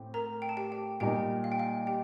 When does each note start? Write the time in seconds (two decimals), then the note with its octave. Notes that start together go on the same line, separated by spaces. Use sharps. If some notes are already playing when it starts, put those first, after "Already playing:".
Already playing: A2 A3 C4 G4
0.14 A#4 A#5
0.42 G5
0.49 A5
0.57 G4 G5
0.72 G4 G5
1.00 A#2 G3 A#3 D#4 G4 A#4 G5
1.44 F5
1.52 G5
1.60 F5
1.87 G4 G5